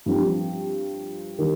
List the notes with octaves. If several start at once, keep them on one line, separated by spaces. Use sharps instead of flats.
G2 F3 C4 G4
D#3 G3 A#3